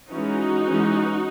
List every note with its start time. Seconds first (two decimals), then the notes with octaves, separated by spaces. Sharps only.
0.12 E3 G#3 C#4 D#4 F#4
0.65 E3 G#3 C#4